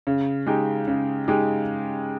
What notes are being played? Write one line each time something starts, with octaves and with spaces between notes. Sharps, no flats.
C#3
G#3 D#4 G4
C#3
G#3 D#4 G4